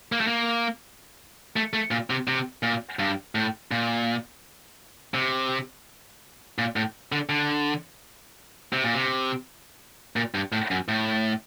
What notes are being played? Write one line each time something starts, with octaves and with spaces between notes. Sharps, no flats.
A#3
A3
A#3
A3
A3
A#2
C3
C3
A#2
G2
A2
A#2
C3
A#2
A2
D3
D3
C3
A#2
C3
A#2
G2
A2
F#2
A2